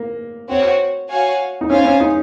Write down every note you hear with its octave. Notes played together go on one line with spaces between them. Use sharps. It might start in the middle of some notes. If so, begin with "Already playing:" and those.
Already playing: A#3
C4 F#4 C#5
F#4 C#5 F5 G#5
D#4
C#4 F4 C5 F5 G#5
C#4
D#4